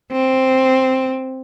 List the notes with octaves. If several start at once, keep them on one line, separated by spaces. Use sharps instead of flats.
C4